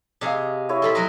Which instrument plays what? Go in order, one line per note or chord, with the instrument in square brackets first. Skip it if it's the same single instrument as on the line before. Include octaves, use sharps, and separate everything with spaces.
[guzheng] C3 G#4 [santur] D#5 F5
[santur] E4 C#5 D#5
[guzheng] C4 F4 B5 [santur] A4
[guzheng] F#3 A#4 D#5